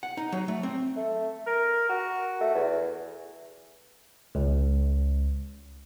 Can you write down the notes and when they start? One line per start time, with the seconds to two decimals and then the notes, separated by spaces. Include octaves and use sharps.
0.03 F#5
0.17 D#4
0.32 F#3
0.48 A3
0.63 C4
0.97 A3
1.46 A#4
1.89 F#4
2.41 A3
2.55 E2
4.35 C#2